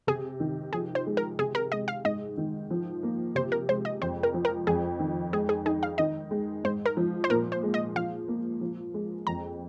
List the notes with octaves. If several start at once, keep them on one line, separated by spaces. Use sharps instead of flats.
C3 G#4
D#3
F3 G#4
C5
G#3
A#4
C3 G#4
A#4
G#3 D#5
F5
G#2 D#5
D#3
F3
A#3
C3 C5
A#4
G#3 C5
D#5
F2 C5
A#4
F3
A#4
F2 G#4
D#3
G#3 G#4
G#4
D#4 G#4
F5
D#3 D#5
G#3
G#2 C5
A#4
F3
C5
A#2 A#4
C5
G#3
D#5
F3 F5
A#3
F3
G#3
F2 A#5